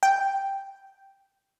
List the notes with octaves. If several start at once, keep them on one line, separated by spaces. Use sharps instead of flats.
G5